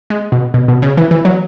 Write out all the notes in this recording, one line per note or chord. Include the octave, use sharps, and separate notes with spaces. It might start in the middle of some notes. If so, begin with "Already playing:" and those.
G#3
B2
B2
B2
C#3
E3
E3
F#3